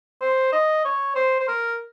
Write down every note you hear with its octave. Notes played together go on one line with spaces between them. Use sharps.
C5
D#5
C#5
C5
C5
A#4